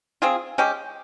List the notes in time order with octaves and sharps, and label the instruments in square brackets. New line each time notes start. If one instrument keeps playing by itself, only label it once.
[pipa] C4 F4 G#4
G#3 C#4 G4